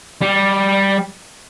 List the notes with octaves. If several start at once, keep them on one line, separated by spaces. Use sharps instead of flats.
G3